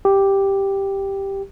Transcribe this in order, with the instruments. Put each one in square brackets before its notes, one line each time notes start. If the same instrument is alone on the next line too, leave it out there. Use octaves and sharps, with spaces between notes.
[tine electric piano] G4